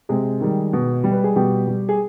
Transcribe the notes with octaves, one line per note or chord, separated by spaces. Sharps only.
C3 G#3 G#4
D#3 G3
B2
G3
B4
G#4
B2 G3 G4
G3
G#4